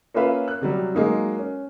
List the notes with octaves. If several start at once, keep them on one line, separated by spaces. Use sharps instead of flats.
A#3 C#4 F4 B4 E5 F5
F#6
C3 F#3 G3
F#3 G#3 A#3 D#4
C#4